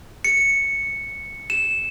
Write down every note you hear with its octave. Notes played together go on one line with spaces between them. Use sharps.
C#7
E7